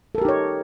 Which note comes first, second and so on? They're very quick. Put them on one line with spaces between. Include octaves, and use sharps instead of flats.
A4 A#4 G4 D#4 C#5